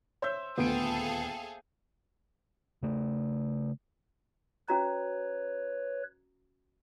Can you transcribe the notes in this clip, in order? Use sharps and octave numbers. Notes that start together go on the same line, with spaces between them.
C5 C#5 E5 G6
D#1 D2 B3 G#4 A4 F5 G5 D7
C#3 A3
C#4 F#4 B4 C#5 A#5